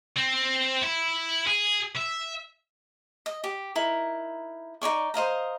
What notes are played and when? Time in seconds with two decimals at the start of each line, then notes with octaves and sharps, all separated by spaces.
0.17 C4
0.83 E4
1.47 G#4
1.97 E5
3.26 D#5
3.44 G4
3.75 D#4 E4 A#4
4.82 D#4 C#5 D5 C#6
5.14 C5 D#5 F5 A#5